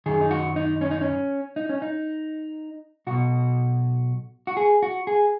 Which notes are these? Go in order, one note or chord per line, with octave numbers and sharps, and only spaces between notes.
F#2 D#3 G#4
D#4
F#4
D#4
C#4
D#4
C#4
D#4
C#4
D#4
B1 B2 F#4
F#4
G#4
F#4
G#4